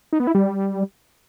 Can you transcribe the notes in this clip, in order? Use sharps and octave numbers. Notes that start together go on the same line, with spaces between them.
D#4
B3
E4
G3